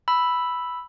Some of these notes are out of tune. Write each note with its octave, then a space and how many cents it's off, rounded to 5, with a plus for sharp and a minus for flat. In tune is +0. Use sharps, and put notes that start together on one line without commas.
B5 +0 E6 +0